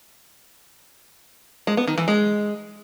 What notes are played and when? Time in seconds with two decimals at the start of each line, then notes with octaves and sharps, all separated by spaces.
1.67 G#3
1.77 B3
1.87 D#3
1.98 E3
2.08 G#3